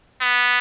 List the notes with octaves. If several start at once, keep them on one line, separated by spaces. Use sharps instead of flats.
B3